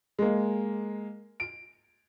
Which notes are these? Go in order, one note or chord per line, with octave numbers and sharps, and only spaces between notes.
G#3 A#3
D7